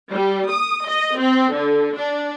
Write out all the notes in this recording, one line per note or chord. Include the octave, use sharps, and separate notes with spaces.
G3
D#6
D#5
C4
D3
D4